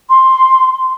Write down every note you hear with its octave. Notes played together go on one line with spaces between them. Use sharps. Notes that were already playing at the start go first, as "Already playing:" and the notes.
C6